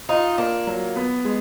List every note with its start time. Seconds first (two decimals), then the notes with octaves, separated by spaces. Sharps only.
0.09 D#4 F4
0.38 A#3 D4
0.67 F#3
0.96 B3
1.25 G#3